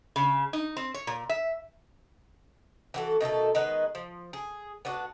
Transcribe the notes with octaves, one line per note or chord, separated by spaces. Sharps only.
C#3
D#4
C4
C#5
A#2
E5
E3 F#4 A4
B2 D#3 A3 A4
D#3 G#3 B3 B4
F3
G#4
B3 D4 F#4